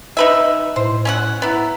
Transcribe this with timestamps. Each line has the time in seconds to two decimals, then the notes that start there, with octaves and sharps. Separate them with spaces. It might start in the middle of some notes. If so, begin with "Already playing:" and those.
0.17 D#4 B4 E5
0.76 A2 C5
1.05 C#4 E5 F#5
1.42 B3 E4 A#5